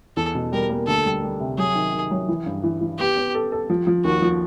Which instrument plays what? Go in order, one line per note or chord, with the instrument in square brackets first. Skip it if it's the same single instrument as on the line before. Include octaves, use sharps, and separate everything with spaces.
[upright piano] E2 [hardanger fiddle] A4
[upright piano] B2
[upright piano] G3 [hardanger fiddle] A#4
[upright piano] A#3
[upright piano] D2 [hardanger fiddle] A4
[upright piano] G3
G3
C3
[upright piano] F#3 [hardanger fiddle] G#4
[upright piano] D#3
D#3
F#3
E3
G2
E3
E3
[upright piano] B3 [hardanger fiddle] G4
[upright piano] B3
A4
A4
F3
F3
[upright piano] D#2 [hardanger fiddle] F#4
[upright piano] F3